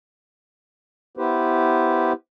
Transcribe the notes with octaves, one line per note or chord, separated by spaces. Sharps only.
B3 E4 G4 B4 C5